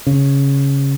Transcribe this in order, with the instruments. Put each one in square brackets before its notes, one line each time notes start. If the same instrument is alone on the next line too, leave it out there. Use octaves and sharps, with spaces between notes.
[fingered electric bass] C#3